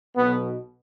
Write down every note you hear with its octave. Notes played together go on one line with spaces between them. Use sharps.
B1 B2 B3